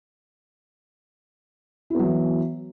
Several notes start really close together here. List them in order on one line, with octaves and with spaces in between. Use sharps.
E4 B3 F#3 E3